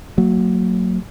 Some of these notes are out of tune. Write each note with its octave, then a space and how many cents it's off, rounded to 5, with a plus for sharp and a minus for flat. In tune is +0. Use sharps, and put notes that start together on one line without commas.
F#3 +0 A#3 -35